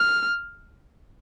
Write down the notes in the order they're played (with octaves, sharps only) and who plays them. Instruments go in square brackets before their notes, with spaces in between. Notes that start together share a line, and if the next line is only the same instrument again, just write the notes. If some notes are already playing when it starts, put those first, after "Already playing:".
Already playing: [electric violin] F6